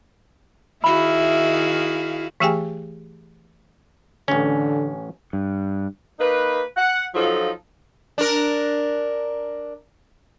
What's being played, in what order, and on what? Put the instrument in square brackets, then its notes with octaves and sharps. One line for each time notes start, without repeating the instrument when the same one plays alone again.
[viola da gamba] D#3 F#4 G#4 [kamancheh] E4 F5 [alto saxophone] E5 [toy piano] B5
[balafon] E3 A3 G4 G#4 G5 G#5
[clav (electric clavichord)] A1 C#4 [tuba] D3
[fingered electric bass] G2
[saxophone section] A#3 D#4 B4
F#5
F3 F#3 D#4 F4 A4
[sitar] D4 A#4